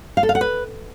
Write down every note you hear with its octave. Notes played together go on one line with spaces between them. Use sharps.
F5
A4
F5
F#5
B4